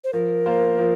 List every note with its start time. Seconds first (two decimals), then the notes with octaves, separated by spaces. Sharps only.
0.04 C5
0.13 F3 A#4
0.46 A#3 F4 C5
0.79 F3